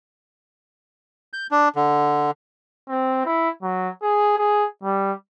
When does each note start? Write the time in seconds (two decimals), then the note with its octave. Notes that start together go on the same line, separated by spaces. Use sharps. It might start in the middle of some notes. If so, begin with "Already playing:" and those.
1.33 G6
1.51 D4
1.76 D3
2.89 C4
3.25 E4
3.63 F#3
4.02 G#4
4.38 G#4
4.83 G3